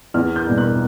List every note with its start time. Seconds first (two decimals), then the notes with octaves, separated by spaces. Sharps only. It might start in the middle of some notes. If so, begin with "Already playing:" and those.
0.14 E2 F6
0.36 G6
0.47 B2 G3
0.58 F#6